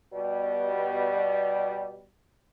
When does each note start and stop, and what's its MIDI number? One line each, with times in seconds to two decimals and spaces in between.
0.13 2.04 47
0.13 2.04 55